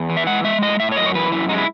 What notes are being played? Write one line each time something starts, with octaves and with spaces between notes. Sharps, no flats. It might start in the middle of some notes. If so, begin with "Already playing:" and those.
Already playing: E2
E3
E5
G#3 F#5
G#3 E5
A2 D#5
A2 E5
C#5
F#2 D#5
C#5
E3 B4
F#2 E4
G#3 D#4
E4